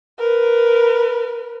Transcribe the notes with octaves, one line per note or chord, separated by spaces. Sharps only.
A#4 B4